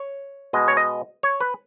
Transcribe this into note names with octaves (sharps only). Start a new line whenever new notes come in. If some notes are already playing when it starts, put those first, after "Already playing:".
Already playing: C#5
B2 G#3 D#5
C#5
D#5
C#5
B4